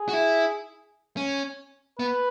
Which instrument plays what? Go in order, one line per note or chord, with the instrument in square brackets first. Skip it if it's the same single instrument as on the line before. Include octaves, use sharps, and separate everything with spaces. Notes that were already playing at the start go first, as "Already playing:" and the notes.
Already playing: [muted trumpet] G#4
[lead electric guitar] F#4
E4
C#4
[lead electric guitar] B3 [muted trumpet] B4